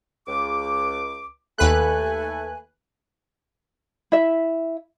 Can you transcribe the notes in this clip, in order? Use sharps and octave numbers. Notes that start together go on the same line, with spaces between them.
C#2 D6
D#2 A3 B4 G#5 F#6
E4 E5